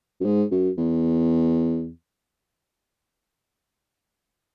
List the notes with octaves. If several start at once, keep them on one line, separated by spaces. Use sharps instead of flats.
F#2
G#2
F#2
E2